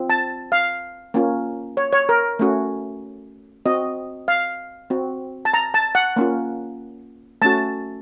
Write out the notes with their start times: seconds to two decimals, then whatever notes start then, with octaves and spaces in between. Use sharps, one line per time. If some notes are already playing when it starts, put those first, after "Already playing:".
Already playing: C4 F4
0.10 A5
0.52 F5
1.14 A#3 C#4 F4
1.77 C#5
1.93 C#5
2.09 A#4
2.39 A3 C#4 F#4
3.66 C4 F#4 D#5
4.28 F5
4.90 C4 F#4
5.45 A5
5.54 A#5
5.74 A5
5.95 F#5
6.16 A#3 C#4 F4
7.42 A3 C#4 F#4 A5